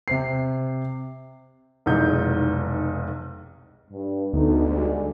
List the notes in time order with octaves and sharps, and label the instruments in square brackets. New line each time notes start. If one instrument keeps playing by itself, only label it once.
[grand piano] C3 C5 C7
[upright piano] F1 B1 E3 G#3 D#4 G6
[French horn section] G2
[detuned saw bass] D2 [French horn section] A3 B3 D#4
[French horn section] D3 G3 G#3